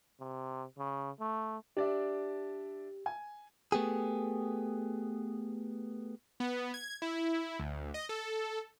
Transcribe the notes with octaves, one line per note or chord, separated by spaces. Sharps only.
C3
C#3
A3
D4 G4 D5 E5
G#5
A3 B3 G4 G#4
B3
G#6
E4
D2
D#5
A4